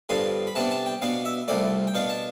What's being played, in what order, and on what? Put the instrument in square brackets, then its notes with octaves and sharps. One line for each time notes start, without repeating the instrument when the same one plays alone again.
[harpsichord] G2 D3 F3 B3 C6
B5
C3 G3 B3 D4 A5
A5
G5
B2 B3 D4 F5
E5
C2 C3 F3 A3 D5
G5
B2 B3 D4 F5
A5